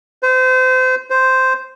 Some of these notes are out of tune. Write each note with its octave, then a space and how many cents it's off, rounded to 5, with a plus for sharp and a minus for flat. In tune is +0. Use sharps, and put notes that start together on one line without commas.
C5 -30
C5 -5